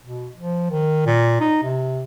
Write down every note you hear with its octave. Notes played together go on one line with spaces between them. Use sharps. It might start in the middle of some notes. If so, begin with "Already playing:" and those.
B2
F3
D#3
A#2
D#4
C3